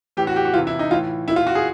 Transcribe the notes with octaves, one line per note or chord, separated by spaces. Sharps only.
A2 E3 G4
F#4
G4
F#4
C3 E3 F4
E4
D#4
A2 E3 F4
A#2 E4
F4
F#4
G#4